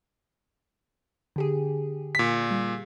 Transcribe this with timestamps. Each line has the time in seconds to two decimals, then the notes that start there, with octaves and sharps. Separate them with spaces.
1.36 D3 G4 G#4
2.15 A#2 B6
2.51 G3